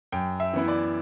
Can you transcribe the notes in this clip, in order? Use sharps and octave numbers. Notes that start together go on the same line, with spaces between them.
F#2 G5
E5
E3 B3 E4
D5